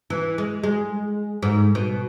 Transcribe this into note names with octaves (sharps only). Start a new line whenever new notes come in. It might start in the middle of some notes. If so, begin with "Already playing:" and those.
E3
G#3
G#3
G#2
B2